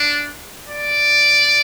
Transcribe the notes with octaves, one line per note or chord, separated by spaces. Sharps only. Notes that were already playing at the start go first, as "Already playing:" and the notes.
Already playing: D4
D5